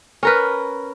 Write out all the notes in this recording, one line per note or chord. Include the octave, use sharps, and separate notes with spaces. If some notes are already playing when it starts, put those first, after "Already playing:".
C#4 A#4 B4